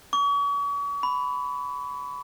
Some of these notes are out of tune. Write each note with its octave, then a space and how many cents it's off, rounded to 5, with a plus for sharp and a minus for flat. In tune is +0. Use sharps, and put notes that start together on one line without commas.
C#6 +40
B5 +15